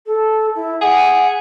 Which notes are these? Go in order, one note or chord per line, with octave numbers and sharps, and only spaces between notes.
A4
E4
G#4 F#5